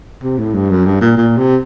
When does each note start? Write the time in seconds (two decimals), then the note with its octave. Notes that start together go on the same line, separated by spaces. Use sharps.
0.23 C3
0.39 A2
0.55 G2
0.70 F#2
0.86 G2
1.01 A#2
1.17 A#2
1.38 C3